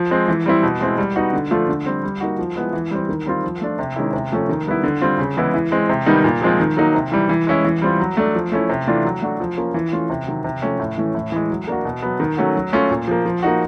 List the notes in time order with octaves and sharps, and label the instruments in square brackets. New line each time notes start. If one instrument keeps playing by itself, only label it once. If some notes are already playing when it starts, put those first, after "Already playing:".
Already playing: [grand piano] F3
G#3 C4
E3
G3 C4 E4
B2
G#3 C4 E4
G3
B3 D#4 F#4
D3
F3 A3 D4 F4
D3
G3 C4
G3
A#3 D#4 F#4
F3
G#3 B3 E4
E3
G3 C4
D#3
G3 C4 F4
F3
A3 D4 F4
C3
D#3 G#3 C#4 E4
C3
F3 A3 C#4
D#3
G3 B3 E4
D3
G3 C4 F4
C#3
E3 G#3 B3 E4
E3
G#3 C4
C3
D#3 G3 B3 D#4
A#2
F3 G#3 C4 F4
D#3
F#3 A#3 D#4
C3
E3 G3
E3
G#3 C#4 E4
E3
G3 C4 F4
F#3
A3 D4
F3
A3 C#4 E4
C3
E3 A3 D4 F4
F#3
A3 D4 F#4
F3
A#3 C#4 F4
E3
A3 C#4 F4
C3
D#3 F#3
C3
F3 A3 C#4
A2
E3 A3 C#4
A2
E3 G#3
F#3
A#3 D4 F#4
B2
F#3 B3
D#3
F#3 A3 C#4 F#4
F#3
A3 C#4 F4
A#2
F3 A#3
F3
A#3 D#4 F#4